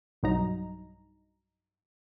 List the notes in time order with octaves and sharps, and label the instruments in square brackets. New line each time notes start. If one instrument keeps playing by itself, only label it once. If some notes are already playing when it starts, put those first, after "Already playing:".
[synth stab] B1 G2 F#3 D#4 A#5